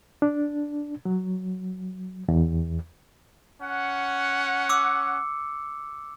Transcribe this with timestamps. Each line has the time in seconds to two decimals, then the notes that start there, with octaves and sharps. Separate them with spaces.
0.22 D4
1.05 F#3
2.28 E2
3.62 C#4 F#5
4.69 D6 E6 C#7